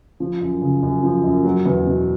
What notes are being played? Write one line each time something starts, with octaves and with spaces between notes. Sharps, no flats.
F3
F#2
C#3
F#2
F3
F#2
F#3
E2
B2